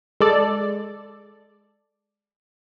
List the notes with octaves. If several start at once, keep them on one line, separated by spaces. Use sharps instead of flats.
G#3 A4 D5